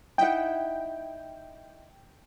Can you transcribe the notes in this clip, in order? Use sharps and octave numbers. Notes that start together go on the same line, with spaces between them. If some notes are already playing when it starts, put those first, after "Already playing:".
D#4 E4 F#5 G5